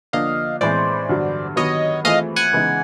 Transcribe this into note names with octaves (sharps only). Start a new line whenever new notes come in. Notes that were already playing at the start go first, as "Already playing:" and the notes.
D3 F3 A#3 D4 D#5 F5
A2 E3 G#3 C4 C5 D5
G2 D3 F#3
D#3 F#3 B3 C#5 D#5
E3 A3 C4 F4 G#4 D#5 F5
F#5 G#5
C#3 E3 G#3 B3 D#4